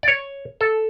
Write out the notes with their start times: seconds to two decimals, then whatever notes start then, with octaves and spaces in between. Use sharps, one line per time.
0.03 D5
0.08 C#5
0.61 A4